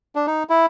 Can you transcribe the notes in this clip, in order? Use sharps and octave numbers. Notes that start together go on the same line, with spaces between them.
D4
D#4
E4